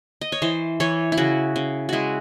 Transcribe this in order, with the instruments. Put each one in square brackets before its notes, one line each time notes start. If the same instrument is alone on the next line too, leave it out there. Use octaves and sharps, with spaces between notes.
[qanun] D#5
C#5
E3 C5
E3 C#5
E4
C#3 F#4
C#3
G#3 E4 F#4